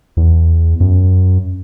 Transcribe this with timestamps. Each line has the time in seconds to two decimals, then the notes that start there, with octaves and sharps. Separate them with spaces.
0.17 E2
0.80 F#2